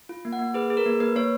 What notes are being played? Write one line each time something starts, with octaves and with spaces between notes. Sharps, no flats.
F4
A#3
F#5
A#3
G#4 B4
G#4
A#4
A#3
A#3 B4
A#3 C#5